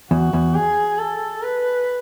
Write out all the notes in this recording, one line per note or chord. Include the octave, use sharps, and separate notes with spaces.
E2 F#4
E2
G#4
A4
B4